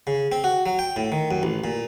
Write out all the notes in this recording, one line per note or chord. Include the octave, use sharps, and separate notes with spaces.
C#3
C4
F#4
F#3
G5
A2
D#3
F#2
A1
A#2